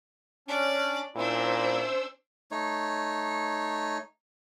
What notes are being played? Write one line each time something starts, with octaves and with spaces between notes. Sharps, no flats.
C#4 D4 D5
A#2 C#4 D4 E4 C5 E6
A3 D#4 C#5